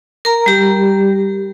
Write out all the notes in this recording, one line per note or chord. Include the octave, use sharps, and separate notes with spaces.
A#4 A#5
G3 G4